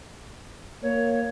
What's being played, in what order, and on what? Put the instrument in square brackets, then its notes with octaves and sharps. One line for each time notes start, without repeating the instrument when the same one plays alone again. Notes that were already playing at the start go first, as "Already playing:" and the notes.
[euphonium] A#3 [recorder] C#5